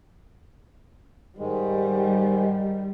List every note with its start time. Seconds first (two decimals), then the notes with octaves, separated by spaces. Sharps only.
1.38 G#2 D#3 G3 G#3